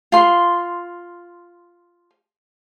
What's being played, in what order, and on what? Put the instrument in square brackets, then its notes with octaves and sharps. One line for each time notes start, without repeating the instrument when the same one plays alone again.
[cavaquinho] F4 C6